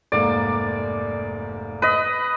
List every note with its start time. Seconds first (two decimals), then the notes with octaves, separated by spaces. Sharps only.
0.12 F1 G#2 A#3 D5
1.82 B4 D#5